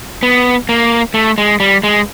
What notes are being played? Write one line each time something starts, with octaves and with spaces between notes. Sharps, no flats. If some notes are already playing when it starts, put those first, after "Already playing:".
B3
A#3
A3
G#3
G3
G#3